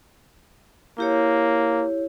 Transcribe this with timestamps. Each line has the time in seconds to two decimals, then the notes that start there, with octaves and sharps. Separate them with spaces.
0.98 A#3 E4 G4 C#5